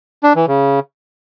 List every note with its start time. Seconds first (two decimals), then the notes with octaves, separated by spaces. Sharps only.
0.23 D4
0.35 E3
0.47 C#3